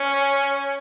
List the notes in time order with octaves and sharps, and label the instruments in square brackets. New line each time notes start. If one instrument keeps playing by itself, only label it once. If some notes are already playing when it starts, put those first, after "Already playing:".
Already playing: [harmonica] C#4